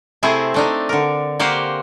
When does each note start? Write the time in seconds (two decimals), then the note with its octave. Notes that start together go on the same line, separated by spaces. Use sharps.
0.23 C3 A3 C4 E4 G#4
0.54 A3 D4 D#4
0.89 D3 A#4
1.39 A#3 F#4 G4 C5 F5